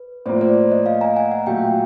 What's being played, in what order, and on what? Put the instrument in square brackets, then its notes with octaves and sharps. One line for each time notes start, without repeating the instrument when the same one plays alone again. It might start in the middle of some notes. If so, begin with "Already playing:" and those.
Already playing: [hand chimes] B4
[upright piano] A2 F3 A#3 [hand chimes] C5 D5
[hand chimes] C5 D5
C#5 D#5
D#5 F5
G#5 A#5
F#5 G#5
F#5 G#5
[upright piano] A#2 F#3 A3 [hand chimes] F5 G5